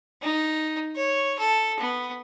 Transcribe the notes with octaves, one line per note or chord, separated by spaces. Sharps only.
D#4
C#5
A4
B3